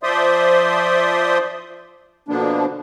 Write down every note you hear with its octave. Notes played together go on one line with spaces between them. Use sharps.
F3 C5 D5 E5 C6 D#6
B2 D3 F3 A#3 B3 D4